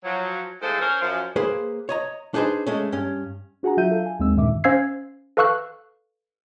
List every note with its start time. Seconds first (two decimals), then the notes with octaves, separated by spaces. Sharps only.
0.04 F3 F#3
0.62 E2 A2 F3 G#3 A4 C5
0.81 C#4 A#4 C5
1.02 F#2 F3
1.36 A#3 G#4 B4 C5
1.89 C#5 D#5 A#5
2.34 D4 D#4 G#4 B4 C5
2.67 G#3 A3 C#4
2.92 G2 C#4
3.63 D4 F#4 G#4 F#5 G#5 A#5
3.77 F#3 F4 E5 G6 D#7
3.91 A4 F5
4.06 G#5
4.19 D#2 G#3 C4 E6
4.36 G2 A#2 D#3 E5 D6
4.64 C#4 C5 F5 E6 G#6 C7
5.37 A4 B4 F5 C#6 E6 F#6